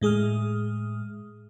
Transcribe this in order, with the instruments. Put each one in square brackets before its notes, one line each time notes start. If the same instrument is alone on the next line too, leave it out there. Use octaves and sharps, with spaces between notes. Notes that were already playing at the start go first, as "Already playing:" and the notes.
[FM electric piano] A2 G#3 G#4 D#6 F6